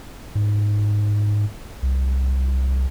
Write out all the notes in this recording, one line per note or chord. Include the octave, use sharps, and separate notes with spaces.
G#2
C2